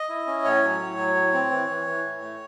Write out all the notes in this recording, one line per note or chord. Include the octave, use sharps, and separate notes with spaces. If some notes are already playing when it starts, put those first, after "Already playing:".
Already playing: D#5
E4
C#4
A2 C#5
F#3
A2
F#3
A2
C4
E3
E3
E3
A2
A3